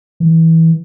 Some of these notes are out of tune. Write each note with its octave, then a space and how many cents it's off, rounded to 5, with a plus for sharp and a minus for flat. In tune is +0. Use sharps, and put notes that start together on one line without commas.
E3 -20